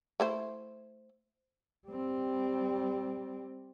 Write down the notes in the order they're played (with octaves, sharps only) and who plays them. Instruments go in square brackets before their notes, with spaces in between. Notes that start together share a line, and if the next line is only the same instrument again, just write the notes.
[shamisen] A3 E4 C5
[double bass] G3 C4